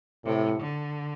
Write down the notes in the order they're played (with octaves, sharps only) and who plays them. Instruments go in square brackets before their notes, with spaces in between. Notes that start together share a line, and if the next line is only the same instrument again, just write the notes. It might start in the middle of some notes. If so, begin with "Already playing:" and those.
[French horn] A2 [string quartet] C3
[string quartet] D3